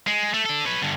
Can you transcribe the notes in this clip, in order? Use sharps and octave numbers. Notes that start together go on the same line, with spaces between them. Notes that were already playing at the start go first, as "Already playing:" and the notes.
G#3
A3
D4 A4
B4 C#5
G2 D3